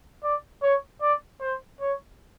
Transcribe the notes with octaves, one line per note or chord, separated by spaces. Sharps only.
D5
C#5
D5
C5
C#5